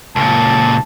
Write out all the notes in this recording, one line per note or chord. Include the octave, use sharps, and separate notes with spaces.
C#2 A#2 A5